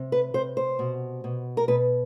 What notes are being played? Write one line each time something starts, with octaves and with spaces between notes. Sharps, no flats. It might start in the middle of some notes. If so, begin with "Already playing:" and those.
Already playing: C3
B4
C3 C5
C5
B2
B2
A#4
B2 B4